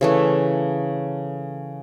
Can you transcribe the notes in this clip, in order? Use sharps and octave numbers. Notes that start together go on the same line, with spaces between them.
C#3 E3 A3